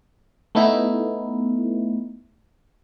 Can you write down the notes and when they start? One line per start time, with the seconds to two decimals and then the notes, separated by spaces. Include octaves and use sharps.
0.55 A3 B3 D#4 E4